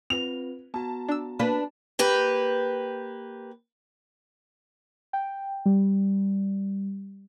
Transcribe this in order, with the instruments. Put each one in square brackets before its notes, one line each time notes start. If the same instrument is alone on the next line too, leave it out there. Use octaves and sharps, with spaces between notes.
[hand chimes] C4 F4 B4 [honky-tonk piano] F7
[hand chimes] B3 F#4 A#5 [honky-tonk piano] A5
[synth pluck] D4 E6
[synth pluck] A#3 [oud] D4 B4
[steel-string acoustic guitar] A#3 G4 B4
[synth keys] G5
G3